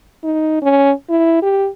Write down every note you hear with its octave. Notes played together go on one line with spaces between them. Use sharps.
D#4
C#4
E4
G4